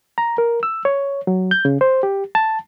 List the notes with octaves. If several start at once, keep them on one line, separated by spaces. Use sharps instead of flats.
A#5
A#4
E6
C#5
F#3
G6
C#3
C5
G4
A5